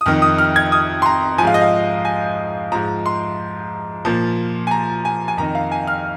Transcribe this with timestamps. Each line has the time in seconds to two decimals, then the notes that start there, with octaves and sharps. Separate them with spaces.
0.01 D#6
0.06 F2 D#3 F6
0.22 D#6
0.38 F6
0.56 G#6
0.72 D#6
1.02 C6
1.06 A#5
1.38 F3 G#5
1.44 G#2 F5
1.54 D#5
1.62 F5
2.05 G#5
2.72 G#2 F3 A#5
3.06 C6
4.05 A#2 F3
4.67 G#5
4.71 A#5
5.05 G#5
5.28 G#5
5.37 F2 D#3 A#5
5.55 F5
5.72 G#5
5.87 F6